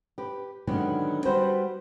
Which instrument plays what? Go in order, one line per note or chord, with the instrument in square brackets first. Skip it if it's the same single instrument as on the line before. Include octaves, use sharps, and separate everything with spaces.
[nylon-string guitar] G4 B4
D3 D#3 F#3 G#3 B3 C#4
G3 F#4 B4 C5